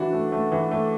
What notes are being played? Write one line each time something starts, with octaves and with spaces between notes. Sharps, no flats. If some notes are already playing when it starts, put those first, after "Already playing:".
Already playing: E3 D4 F#4
A3
A3
E3
A3